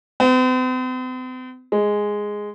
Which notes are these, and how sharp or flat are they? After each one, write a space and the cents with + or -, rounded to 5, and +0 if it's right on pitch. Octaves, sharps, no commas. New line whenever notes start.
C4 -45
G#3 -5